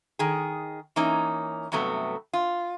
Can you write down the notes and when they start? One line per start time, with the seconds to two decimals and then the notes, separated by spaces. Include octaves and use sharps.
0.19 D#3 G#4
0.96 E3 A#3 C#4 D#4
1.72 G2 C3 F#3 A3 B3
2.33 F4